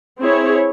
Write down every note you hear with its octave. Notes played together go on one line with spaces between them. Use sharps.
C4 E4 G#4 C#5